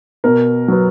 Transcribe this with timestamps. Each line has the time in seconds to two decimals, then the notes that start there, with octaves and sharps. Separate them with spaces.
0.24 B2 A#4
0.68 F#3 B3